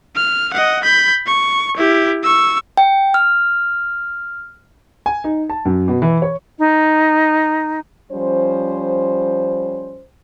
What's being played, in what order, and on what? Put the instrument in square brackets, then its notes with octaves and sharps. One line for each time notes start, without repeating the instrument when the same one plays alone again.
[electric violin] F6
D#5 F#5
B5 G6
C#6
E4 G4
C#6 E6
[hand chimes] G5
F6
[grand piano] G#5
D#4
A5
F#2
B2
E3
C#5
[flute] D#4
[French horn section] F3 G3 C#4 C5